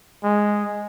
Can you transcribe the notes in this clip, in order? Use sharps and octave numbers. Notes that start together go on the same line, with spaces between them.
G#3